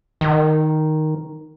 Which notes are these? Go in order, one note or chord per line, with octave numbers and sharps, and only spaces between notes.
D#3